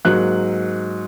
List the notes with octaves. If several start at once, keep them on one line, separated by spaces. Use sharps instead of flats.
G#2 F#3 A#3 F#6